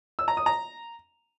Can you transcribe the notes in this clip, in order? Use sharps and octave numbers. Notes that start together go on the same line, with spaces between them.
E6
A#5
D#6
A#5